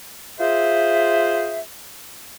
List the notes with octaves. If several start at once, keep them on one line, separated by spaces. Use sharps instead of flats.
F4 G#4 C5 E5